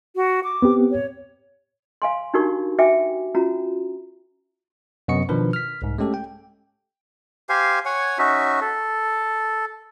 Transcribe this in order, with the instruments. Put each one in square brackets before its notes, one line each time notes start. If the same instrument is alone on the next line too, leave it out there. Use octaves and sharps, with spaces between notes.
[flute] F#4
D6
[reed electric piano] B3 C4 G4
[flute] C#5
[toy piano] F5 G#5 C6
D4 D#4 F#4 G4 A#4 C#6
F#4 E5 G5 G#5 D6
C#4 F4 F#4 A#5
[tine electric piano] F#2 C3 B3 D#5 C#6 C#7
B2 D#3 F3 D4 A#4 B4
F6 B6
C2 G#2
G#3 A3 C#4 G4 A4
G5
[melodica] G4 C5 F5 G#5
C#5 F#5 G#5
C#4 D#4 F#4 E5
A4